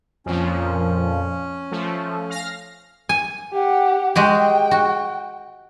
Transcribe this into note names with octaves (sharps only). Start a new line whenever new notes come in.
F2 A#2 F3 C#4
F3 A3
F5 F6 A#6
G#5
G4 F#5
G#3 F#4 G4 G5
F#4